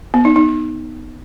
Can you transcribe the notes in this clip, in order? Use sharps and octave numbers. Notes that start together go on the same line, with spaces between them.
B3
D#4
D#4